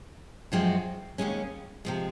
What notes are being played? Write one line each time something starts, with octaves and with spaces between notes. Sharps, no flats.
F#2 F3 G#3 C4 F#4
D#2 C#3 G#3 C#4
C3 F3 G#3